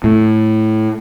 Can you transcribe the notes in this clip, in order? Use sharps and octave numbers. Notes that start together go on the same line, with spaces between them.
A2